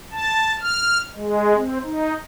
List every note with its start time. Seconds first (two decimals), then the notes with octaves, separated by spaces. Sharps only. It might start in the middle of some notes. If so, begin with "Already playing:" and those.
0.12 A5
0.61 F6
1.13 G#3
1.55 C4
1.84 D#4